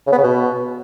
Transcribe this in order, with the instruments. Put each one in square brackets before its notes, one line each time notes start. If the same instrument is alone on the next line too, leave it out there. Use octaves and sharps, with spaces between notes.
[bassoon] C#3
B3
C#3
B2